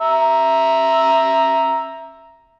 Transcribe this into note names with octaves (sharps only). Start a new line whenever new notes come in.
E5 A#5